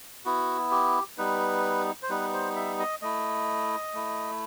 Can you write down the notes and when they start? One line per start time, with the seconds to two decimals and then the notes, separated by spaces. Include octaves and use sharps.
0.25 B3 E4 F#4
0.71 G4
1.18 G3 B3 D#4 B4
2.03 C5
2.09 G3 B3 D#4 B4
2.33 C5
2.56 E5
2.79 D#5
3.02 A3 E4 D#5
3.94 A3 E4